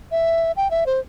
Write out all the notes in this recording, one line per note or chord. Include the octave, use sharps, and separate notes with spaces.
E5
G5
E5
C5